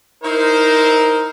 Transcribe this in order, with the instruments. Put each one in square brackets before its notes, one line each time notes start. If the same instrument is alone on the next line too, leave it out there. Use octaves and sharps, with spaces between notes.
[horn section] D#4 E4 C5 [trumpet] A#4